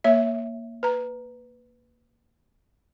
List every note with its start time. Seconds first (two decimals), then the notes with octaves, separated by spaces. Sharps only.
0.04 A#3 C#5 E5
0.83 B4 A#5